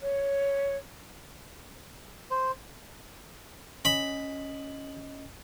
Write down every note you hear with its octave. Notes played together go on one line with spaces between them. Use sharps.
C#5
C5
C#4 D#5 B5